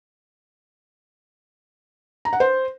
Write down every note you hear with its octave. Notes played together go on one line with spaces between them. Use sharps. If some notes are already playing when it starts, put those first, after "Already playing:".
A#5
F#5
C5